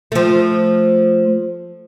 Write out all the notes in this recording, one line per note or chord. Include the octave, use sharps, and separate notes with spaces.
F3 A3